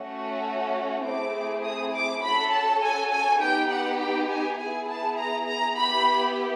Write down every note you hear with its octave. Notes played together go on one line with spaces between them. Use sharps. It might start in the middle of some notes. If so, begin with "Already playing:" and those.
Already playing: A3 C#4 F#4
A3 C4 E4 G#4 D6
D#6
D6
C#4 F#4 A4 B5
A5
G#5
G#5
B3 D#4 G4 G5
F#5
G5
G#5
B3 E4 G#4 G#5
A5
A#5
A#5
B3 E4 G4 B5